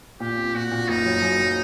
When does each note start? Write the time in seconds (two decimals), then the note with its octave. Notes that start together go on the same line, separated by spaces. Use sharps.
0.20 A#2 G4
0.38 C4
0.55 A#2 F#4
0.72 A#2
0.88 F#1 D#4
1.06 F#3
1.22 F#2
1.39 F#3